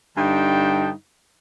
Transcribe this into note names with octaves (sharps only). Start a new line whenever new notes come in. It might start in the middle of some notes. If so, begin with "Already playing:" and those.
G2 D3 D#4 G5 A5